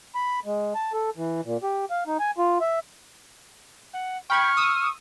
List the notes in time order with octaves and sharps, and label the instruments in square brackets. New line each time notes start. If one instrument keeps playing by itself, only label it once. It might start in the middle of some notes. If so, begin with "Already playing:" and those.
[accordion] B5
G#3
A5
A4
E3
A#2
G4
F5
D#4
G#5
F4
E5
[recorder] F#5
[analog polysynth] G5 B5 G#6 [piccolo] C#6 [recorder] F6
[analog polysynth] D#6 E6